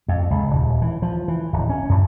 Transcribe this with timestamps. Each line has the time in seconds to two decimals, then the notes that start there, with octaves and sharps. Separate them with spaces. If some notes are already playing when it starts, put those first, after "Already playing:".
0.08 F2
0.31 C#2
0.50 D#1
0.82 E3
1.02 F3
1.28 E3
1.53 D1
1.69 C#4
1.89 F#2